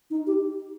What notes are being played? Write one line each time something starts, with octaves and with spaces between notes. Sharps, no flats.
D#4
G4